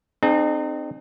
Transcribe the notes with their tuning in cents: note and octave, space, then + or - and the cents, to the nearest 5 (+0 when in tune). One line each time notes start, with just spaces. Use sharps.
C4 +0 D#4 -40 G#4 +30